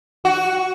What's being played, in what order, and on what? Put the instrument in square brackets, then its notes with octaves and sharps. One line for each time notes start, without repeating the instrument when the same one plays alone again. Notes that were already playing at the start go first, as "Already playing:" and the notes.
[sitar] F#4